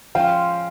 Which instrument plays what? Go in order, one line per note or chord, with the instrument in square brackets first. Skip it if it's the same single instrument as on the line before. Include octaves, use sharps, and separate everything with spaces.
[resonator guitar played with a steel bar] F3 G#3 C#4 F4 [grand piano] F5 G5